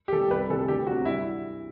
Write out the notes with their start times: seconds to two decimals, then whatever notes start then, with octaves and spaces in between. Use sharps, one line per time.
0.08 G4
0.13 E3 A4
0.17 G3
0.30 C2 B4
0.49 C3 E3 G3 A4
0.61 A4
0.68 D2 G4
0.87 C3 F#3 F#4
1.05 G2 E4